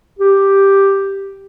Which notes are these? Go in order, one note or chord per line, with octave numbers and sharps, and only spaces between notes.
G4